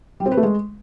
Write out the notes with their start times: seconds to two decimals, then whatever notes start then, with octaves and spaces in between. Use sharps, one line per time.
0.20 G3
0.26 C4
0.32 B4
0.37 A3
0.43 G#3